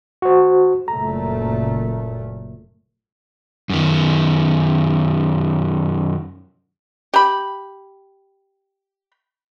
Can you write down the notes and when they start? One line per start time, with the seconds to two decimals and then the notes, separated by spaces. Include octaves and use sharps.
0.22 F#4 C5
0.88 F#1 A#2 A3 A#5
3.70 F#2 D#3
7.14 G4 B5